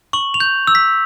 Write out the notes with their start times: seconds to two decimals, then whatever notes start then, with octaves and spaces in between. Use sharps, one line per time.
0.13 C#6 F#7
0.34 F7
0.40 G6
0.67 E6
0.75 B6